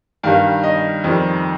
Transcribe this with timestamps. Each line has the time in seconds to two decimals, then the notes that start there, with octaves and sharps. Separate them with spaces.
0.23 G2 D#3 G3 F5
0.64 D#5
1.04 F2 D#3 G3